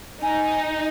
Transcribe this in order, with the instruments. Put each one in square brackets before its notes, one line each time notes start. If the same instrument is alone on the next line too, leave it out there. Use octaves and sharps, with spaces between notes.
[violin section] D#4 [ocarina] G#5